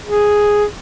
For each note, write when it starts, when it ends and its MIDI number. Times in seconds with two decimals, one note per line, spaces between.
0.06 0.64 68